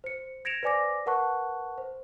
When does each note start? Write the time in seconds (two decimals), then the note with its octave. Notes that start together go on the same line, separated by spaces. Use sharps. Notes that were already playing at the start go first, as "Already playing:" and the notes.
0.04 C5 C#7
0.45 G#6 A#6 C#7 D7 E7 F7
0.63 B4 C5 D5 G#5 D6 A#6
1.06 A#4 B4 F#5 A5 C#6 F#6
1.78 C5